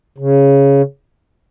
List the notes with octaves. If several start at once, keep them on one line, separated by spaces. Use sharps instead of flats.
C#3